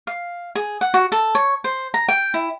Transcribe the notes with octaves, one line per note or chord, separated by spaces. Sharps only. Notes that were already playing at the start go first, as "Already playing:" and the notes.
F5
G#4
F#5
F#4
A4
C#5
C5
A#5
G5
E4